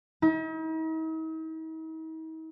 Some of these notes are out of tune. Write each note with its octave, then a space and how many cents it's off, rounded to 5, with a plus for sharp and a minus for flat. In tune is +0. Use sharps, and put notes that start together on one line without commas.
D#4 +45